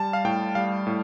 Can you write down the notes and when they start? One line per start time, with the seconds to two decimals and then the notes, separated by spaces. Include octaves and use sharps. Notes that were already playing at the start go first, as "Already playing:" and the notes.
Already playing: G3 A5
0.13 F5
0.25 A2 G5
0.55 G3 F5
0.87 A2